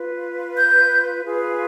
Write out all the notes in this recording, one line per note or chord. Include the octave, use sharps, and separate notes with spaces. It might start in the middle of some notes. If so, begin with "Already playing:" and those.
Already playing: F4 B4
G6
F4 G#4 B4